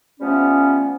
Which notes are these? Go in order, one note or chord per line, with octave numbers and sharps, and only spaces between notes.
F3 G3 A3 B3 C#4